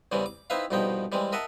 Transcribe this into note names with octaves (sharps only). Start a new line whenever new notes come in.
E2 C#3 E3 G3 C4
D6
C4 D#4 E4 B4 E5 F5
C2 G2 B2 F3 D#4 G5
E3 G3 G#3 C4
A#4 D#5 E5 F#5 A5